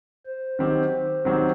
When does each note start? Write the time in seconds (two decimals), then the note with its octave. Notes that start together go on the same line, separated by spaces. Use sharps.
0.26 C5
0.59 D#3 F#3 C4 G4
1.25 D#3 F#3 C4 G4